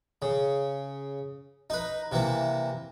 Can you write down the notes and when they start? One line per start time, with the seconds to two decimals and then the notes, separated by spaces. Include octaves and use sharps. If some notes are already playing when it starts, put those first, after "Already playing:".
0.22 C#3
1.70 D#4 B4
2.12 C3 E3 A#3